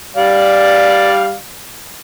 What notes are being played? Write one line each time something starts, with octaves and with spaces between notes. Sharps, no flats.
G3 D5 F5